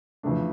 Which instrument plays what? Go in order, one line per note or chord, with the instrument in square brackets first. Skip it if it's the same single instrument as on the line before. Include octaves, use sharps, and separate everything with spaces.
[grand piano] F2 C#3 E3 A3 D4